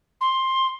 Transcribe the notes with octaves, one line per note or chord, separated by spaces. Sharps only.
C6